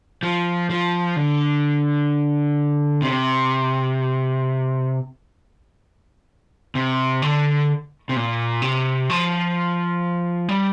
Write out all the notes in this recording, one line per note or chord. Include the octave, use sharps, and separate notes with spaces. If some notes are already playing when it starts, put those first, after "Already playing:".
F3
F3
D3
C3
C3
D3
C3
A#2
C3
F3
G3